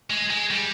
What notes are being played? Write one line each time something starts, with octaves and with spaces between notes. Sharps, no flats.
G#3
G#3
G3